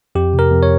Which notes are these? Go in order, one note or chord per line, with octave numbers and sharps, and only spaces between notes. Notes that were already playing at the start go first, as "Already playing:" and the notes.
F2 G4
C3
A#4
F2
C#5